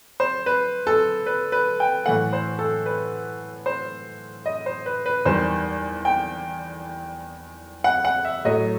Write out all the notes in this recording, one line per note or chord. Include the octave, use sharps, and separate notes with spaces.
C5
B4
A4
B4
B4
G5
A2 E3 A3 F#5
C5
A4
B4
C5
D#5
C5
B4
B4
E2 D#3 G3 C5
G5
F#5
F#5
E5
A2 F#3 A3 D#5